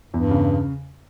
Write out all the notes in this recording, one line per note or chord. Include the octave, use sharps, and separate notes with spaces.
E2 G2
C#3